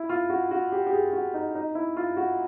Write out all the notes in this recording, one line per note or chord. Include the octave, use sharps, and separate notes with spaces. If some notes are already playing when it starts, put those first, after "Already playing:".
Already playing: E4
F4
F#4
F#4
G4
G4
G#4
F#4
D#4
D#4
E4
F4
F#4